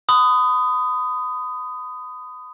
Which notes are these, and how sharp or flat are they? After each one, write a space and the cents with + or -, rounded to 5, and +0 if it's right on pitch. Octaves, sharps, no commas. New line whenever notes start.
B5 +35 D#6 +0